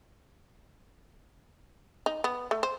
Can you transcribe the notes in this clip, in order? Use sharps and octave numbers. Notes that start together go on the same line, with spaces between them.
D#4
B3
A3
C5